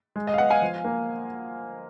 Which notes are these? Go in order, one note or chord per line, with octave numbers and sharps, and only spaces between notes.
G#3
D#5
F5
B3 D#5 F#5
F5 G#5
F3
A#3